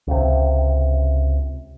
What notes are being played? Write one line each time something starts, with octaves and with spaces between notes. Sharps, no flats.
C#2 C3